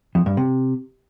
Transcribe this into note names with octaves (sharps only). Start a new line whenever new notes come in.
F2
G2
C3